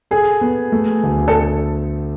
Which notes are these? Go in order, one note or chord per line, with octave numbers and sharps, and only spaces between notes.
G#4 A4
B3
A3
D2
A4